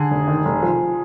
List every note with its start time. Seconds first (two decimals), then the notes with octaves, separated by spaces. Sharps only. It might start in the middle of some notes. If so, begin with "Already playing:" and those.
Already playing: D3 G#4
0.11 F1
0.28 D#3
0.45 F1
0.63 F3